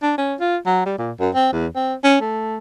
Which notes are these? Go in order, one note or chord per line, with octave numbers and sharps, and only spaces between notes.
D4
C#4
F4
F#3
G3
A#2
F#2
C4
E2
C4
C#4
A3